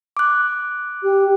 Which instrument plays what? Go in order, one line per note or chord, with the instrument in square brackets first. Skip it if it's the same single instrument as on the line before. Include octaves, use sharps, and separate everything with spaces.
[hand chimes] D6 F#6
[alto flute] G4